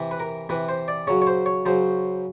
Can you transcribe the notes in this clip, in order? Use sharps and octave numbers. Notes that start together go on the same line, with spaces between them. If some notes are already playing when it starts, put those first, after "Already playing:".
Already playing: C3 E3
B4
A#4
C3 E3 B4
C5
D5
C#3 F#3 C#5
C#5
C5
C#5
C#3 F#3 C5